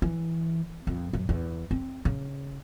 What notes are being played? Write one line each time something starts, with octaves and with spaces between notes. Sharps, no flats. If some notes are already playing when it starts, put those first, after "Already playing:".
E3
F2
F#2
E2
C4
C#3